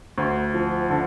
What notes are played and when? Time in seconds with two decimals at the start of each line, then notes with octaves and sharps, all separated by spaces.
0.18 D2
0.54 F3
0.90 D3